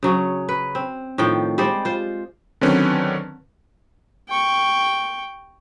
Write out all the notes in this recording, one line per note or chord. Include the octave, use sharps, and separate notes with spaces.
C#3 F#3 C#4
B4
C4
A2 D#3 F3 G5
G3 G#3 C5 D5
F4 C5
D3 D#3 F#3 C4 C#4 B4
G5 C#6